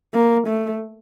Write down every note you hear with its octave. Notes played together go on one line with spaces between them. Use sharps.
A#3
A3